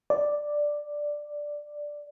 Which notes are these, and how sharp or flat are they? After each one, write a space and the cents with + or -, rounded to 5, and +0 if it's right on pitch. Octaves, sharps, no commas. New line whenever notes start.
D5 +0